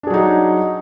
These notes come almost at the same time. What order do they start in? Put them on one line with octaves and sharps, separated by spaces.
D4 G#4 F#3 D#4